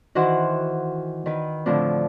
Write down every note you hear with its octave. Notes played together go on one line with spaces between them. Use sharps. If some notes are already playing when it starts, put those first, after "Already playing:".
D#3 E3 F#4 C5 F#5
D#3 B4
A2 D3 F3 C4 D4